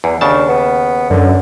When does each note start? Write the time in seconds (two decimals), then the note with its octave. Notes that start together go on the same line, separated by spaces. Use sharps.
0.04 E2 E3
0.21 D#2 C#3 D4 A5
0.49 B3
1.10 F#2 D3